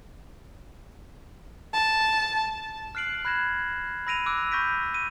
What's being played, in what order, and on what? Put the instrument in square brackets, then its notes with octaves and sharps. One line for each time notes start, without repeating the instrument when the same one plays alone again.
[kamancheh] A5
[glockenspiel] F6 F#6 C7 D7 F#7
B5 F#6 G#6 A#6 E7
B5 E6 A#6 D7 D#7 F7
D6 E6 F#6 D7
B5 C#6 G6 A#6 B6 D7
D#7